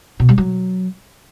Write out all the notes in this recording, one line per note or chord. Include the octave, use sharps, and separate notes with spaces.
B2
G3
F#3